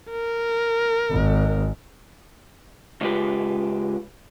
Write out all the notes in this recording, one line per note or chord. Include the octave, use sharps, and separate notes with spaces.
A#4
G#1
C#3 G#3 F4 G4 B4